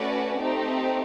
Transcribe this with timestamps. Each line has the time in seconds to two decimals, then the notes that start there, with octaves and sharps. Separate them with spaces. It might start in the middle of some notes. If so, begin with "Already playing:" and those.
Already playing: A3 C#4 F#4 B4 D5
0.38 A3 C4 D#4 G4